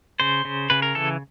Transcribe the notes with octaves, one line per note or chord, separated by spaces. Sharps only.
C#3 C5
C#3
C#3 B4
A#4
E3 A4